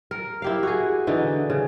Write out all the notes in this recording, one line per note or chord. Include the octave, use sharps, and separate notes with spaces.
A#4
E4 G4 F5
F#4 G#4
D3 E3 D#4
C#3